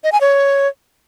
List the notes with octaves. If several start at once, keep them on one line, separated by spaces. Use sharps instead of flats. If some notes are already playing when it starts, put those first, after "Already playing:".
D#5
G#5
C#5